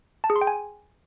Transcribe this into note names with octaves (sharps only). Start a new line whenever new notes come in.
A5
G#4
C6
G5
G#5